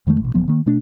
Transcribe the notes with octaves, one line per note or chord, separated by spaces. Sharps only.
F2 D#3 G#3 A3
A1 B2
D#1 F3 F#3 B3
D#3 A#3
B2 A3 D4